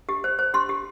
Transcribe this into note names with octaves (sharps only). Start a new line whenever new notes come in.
G4
C5
C5
G4 C6
G4